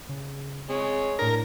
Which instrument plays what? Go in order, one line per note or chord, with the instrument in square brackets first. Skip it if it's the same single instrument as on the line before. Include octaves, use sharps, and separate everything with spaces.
[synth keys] C#3
[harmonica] G#3 C#5 [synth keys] C4
[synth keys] A2 D4 [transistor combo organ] A#4